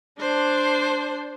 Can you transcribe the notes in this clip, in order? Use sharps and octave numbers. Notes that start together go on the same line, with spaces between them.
D4 C5